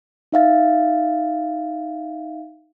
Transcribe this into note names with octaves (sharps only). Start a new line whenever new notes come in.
D#4 E5 F5 A6